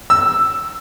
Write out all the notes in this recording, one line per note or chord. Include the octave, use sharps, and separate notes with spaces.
E6